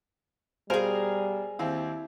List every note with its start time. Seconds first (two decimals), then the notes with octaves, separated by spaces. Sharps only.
0.70 B2 G3 G#4 A#4 C5 F5 G#5
1.59 D#2 C4 E4 F5